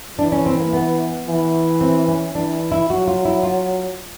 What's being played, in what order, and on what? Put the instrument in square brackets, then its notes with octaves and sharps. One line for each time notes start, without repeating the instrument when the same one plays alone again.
[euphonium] E3 [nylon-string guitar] D4
[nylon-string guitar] C#4
C4
A#3
B3
[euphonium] E3
[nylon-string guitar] C4
C#4
[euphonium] E3 [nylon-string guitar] D4
[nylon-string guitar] E4
[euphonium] F#3 [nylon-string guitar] F#4
[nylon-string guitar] F4
E4
F4